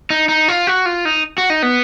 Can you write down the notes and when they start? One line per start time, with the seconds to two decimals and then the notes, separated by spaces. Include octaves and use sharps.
0.10 D#4
0.29 D#4
0.48 F4
0.67 F#4
0.86 F4
1.05 D#4
1.38 F#4
1.50 D#4
1.63 B3